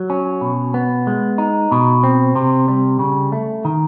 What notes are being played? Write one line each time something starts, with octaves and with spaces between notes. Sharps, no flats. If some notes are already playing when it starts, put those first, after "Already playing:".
Already playing: F#3
C#4
B2
B3
G#3
D#4
B2
C4
C3
G3
C#3
A3
D#3